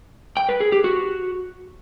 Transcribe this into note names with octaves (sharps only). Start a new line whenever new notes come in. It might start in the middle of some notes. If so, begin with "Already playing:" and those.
G5
B4
G#4
G4
F#4